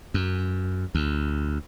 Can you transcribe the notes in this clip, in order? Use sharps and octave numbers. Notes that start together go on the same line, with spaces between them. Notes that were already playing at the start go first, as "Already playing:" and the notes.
F#2
D2